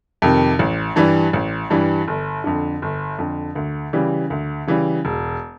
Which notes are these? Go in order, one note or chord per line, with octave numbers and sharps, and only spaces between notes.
F2 C3 D#3
A1
G2 E3 G3
A1
G2 E3 G3
G1
F2 D3
G1
F2 D3
D2
C#3 E3 G3
D2
C#3 E3 G3
E1